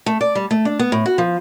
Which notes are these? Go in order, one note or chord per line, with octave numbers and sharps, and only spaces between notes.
A3
D5
G3
A3
D4
B3
A2
F#4
F3